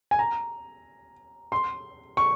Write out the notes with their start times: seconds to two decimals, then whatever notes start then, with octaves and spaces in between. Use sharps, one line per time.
0.11 G#5
0.19 A#5
1.52 C6
2.17 C#6